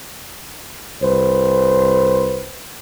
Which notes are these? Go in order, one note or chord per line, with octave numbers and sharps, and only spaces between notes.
C2 B4 C5